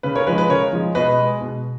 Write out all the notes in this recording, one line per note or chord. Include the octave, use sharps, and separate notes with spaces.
C#3 B4
A#4 C#5
F3 G#3 B4
B4
C#3 A#4 C#5
F3 G#3
B2 B4 D#5
G#3
B2